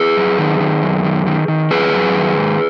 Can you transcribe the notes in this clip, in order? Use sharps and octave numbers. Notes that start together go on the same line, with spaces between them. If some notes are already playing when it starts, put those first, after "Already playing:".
Already playing: G#4 B4
F#2
D#3
D#3
F#2
D#3
D#3
D#3
F#2 G#4 B4
F#2
D#3
G#2